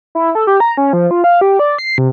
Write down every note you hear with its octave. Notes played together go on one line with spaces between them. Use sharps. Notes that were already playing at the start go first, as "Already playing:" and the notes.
E4
A4
G4
A#5
C#4
F3
F4
F5
G4
D5
C7
C3